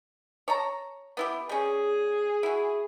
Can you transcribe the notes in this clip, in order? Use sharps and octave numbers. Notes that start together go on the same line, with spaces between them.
C#5 A5 A#5
B3 E4 G4
G3 C#4 G#4
E4 F#4